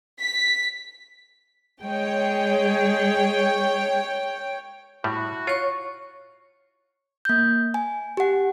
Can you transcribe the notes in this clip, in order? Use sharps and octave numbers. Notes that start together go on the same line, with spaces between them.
B6
G#3 G#4 C#5 G5
A2 G3 E4 F#4
F4 C#5 C#6
A#3 G6
G#5
G4 F#5